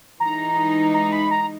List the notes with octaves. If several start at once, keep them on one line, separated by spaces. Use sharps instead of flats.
E3 G#3 D#4 A#5
A#5
B5
A#5